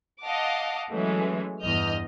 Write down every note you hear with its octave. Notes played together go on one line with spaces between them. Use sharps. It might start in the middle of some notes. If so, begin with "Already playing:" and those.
D#5 F5 F#5 A5 D6
E3 F#3 G#3 A3 C#4
E2 G2 D#5 F6 G6